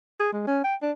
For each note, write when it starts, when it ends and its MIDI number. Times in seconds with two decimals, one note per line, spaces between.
0.20 0.29 68
0.33 0.43 56
0.47 0.60 61
0.64 0.75 79
0.82 0.92 62